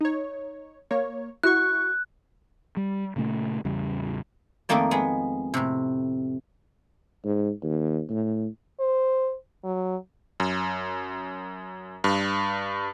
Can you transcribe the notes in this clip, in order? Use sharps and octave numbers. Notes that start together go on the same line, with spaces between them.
D#4 C#5
A#3 C#5
E4 F#4 C#6 F#6
G3
A#2 C#3 A3
A1 E2 C#3 G3
F2 D#3 A3 A#3 D5
G#3 B3
A2 C3
G#2
D#2
A2
C5
F#3
F#2
G2